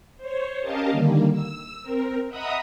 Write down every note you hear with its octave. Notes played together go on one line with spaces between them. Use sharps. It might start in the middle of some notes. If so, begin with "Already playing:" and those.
C5 C#5
C#4 G4 A#4 D#5 F5 A5
D3 D#3 G3 A#3
E6
C4 A#4
D#5 E5 F#5 A#5 B5 D#6